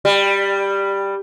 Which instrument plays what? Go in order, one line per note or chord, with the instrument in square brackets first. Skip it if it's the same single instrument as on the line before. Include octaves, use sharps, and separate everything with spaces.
[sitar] G3